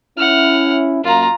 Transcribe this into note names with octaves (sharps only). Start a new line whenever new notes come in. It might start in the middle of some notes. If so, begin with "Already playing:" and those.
C#4 E4 F#5 F6
F#2 A#3 F4 A#5